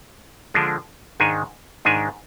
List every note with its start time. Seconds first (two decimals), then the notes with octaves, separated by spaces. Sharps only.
0.54 D3 F3 G#3 D4
1.20 G#2 D#3 G#3 D4 G#5
1.85 G#2 D#3 G#3 D4 G#5